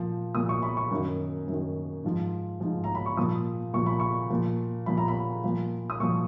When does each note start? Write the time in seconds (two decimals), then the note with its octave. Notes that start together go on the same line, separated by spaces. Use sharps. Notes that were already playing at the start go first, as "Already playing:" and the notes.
Already playing: A#2 F3
0.35 A#2 F3 D#6
0.49 C#6
0.62 B5
0.77 C#6
0.91 F#2 D#3
1.48 F#2 D#3
2.04 G#2 F3
2.60 G#2 F3
2.84 A#5
2.95 B5
3.06 C#6
3.17 A#2 F3 D#6
3.74 A#2 F3 C#6
3.86 B5
4.00 C#6
4.30 A#2 F3
4.86 A#2 F3 B5
4.98 A#5
5.08 B5
5.44 A#2 F3
5.90 D#6
6.00 A#2 F3 C#6